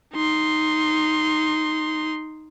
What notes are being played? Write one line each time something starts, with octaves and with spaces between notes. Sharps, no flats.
D#4 C6